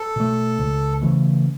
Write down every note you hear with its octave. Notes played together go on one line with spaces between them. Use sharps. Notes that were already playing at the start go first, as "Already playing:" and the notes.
Already playing: A4
B2 A3
C#2
C#3 E3 A3